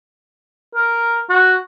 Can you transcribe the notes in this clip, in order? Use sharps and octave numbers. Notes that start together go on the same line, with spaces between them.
A#4
F#4